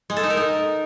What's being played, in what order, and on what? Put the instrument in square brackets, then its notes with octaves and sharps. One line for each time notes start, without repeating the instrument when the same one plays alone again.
[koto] G#3
A4
D#4
A#4
D#4